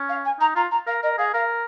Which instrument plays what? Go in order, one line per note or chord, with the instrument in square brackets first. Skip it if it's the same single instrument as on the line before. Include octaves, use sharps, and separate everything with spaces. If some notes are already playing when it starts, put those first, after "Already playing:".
Already playing: [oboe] C#4
[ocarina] F5
G#5
[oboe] D#4 [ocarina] A#5
[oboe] F4 [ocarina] A#5
[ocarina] A#5
[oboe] A#4 [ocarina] F5
[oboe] A#4 [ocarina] D#5
[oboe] G#4 [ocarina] F5
[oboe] A#4 [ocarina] F5